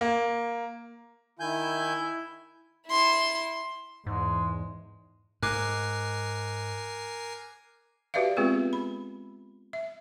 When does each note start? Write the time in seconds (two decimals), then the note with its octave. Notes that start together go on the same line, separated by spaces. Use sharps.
0.01 A#3
1.40 D#3 E4 G#5 G6
2.88 E4 C6
4.06 E2 G#2 G#3
5.43 G#2 A#4 G#5 D6 F#6 C7
8.14 F#4 G4 B4 D5 E5 F5
8.37 G#3 B3 C4 F4 G#4 B4
8.73 B5
9.73 E5